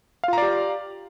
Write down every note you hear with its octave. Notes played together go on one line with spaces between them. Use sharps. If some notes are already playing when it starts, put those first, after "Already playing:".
F4 G4 D5 F5 A#5